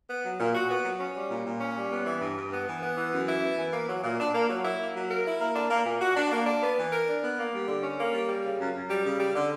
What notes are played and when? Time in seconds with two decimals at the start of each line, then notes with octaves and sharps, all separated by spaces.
0.09 B3
0.24 F#3
0.40 A#2
0.55 F#4
0.70 B3
0.85 F#3
1.00 C#4
1.15 G3
1.30 A#2
1.46 A#2
1.61 C#4
1.76 G3
1.91 B3
2.06 E3
2.21 G2
2.36 G2
2.52 B3
2.67 E3
2.82 B3
2.97 E3
3.13 F#2
3.27 E4
3.43 B3
3.58 E3
3.73 A#3
3.88 F#3
4.04 A#2
4.19 D4
4.34 A#3
4.49 F#3
4.65 E4
4.80 A#3
4.95 F#3
5.10 A#4
5.25 E4
5.40 A#3
5.56 D4
5.70 A#3
5.86 A#2
6.01 F#4
6.16 D4
6.31 A#3
6.46 D4
6.62 B3
6.77 E3
6.92 A#4
7.07 D4
7.23 B3
7.38 A#3
7.52 G3
7.68 D3
7.83 C#4
7.98 A#3
8.13 G3
8.29 G3
8.44 C#3
8.59 F#2
8.74 F#2
8.89 G3
9.04 C#3
9.20 G3
9.35 D3